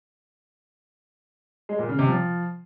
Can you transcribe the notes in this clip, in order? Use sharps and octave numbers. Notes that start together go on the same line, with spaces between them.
G#3
A#2
C#3
C3
F3